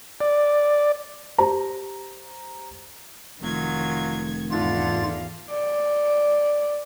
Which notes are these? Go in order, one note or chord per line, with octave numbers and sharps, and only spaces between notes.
D5
G4 C5 A#5
F1 D#3 F#3 F4 G#6
E2 G#2 D3 A3 F4 F5 A6
D5